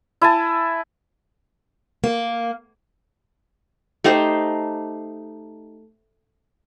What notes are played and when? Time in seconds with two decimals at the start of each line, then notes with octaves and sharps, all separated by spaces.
0.21 E4 G#5 A5
2.04 A#3
4.04 A3 D#4 G4 C5